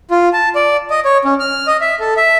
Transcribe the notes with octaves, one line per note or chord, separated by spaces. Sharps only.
F4
A5
D5
D#5
C#5
C#4
F6
D#5
E5
A4
E5